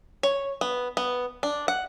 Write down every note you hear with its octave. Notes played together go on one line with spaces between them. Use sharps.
C#5
B3
B3
D4
F#5